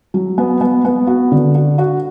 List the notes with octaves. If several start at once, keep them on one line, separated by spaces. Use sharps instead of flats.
F#3
B3
B3
B3
F#4
D3
F#4
F#4